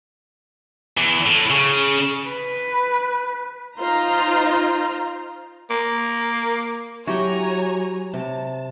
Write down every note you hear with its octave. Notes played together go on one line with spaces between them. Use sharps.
E2
A2
C#3
B4
D#4 F4 C5 A#5
A#3
F#3 E4 F#4 G4 C#5 G#5 A#5
C3 A5